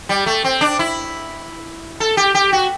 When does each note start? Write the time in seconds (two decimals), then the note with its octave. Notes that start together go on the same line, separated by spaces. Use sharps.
0.09 G3
0.26 A3
0.44 C4
0.61 D4
0.79 E4
2.00 A4
2.17 G4
2.35 G4
2.52 F#4